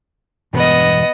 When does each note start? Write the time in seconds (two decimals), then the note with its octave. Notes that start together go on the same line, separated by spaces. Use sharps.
0.54 E1 G2 B3 D#5